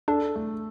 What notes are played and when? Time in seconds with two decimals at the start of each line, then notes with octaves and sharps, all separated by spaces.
0.08 D4 A4
0.36 A3